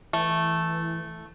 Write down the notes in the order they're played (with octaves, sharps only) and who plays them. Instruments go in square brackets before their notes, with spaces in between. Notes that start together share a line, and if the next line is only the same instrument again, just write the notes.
[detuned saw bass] E3 [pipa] A3